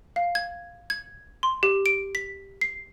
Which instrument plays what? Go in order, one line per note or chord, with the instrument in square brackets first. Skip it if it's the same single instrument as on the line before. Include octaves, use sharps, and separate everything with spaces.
[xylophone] F5
G#6
G#6
C6
G4
D7
B6
C7